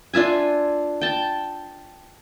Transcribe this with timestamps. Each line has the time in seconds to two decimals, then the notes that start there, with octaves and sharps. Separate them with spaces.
0.14 D4 F4 E5 G#5
1.01 G5 A5